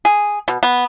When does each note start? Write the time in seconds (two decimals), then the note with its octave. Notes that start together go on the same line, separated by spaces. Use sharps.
0.05 G#4
0.48 B2
0.63 B3